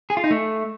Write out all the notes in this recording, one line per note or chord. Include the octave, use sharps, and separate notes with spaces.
G#4
F4
D#4
A3